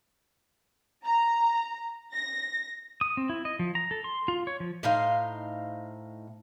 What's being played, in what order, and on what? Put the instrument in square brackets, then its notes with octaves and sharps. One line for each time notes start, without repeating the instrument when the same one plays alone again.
[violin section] A#5
A#6
[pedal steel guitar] D#6
C4
E4
D#5
F3
A#5
A4
C6
F4
C#5
F3
[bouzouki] A2 D#4 C5 F5